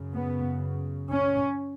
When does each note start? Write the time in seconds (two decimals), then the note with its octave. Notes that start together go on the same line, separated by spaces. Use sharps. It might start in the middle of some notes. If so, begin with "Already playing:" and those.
Already playing: F#2 C#3
0.14 B3
1.11 C#4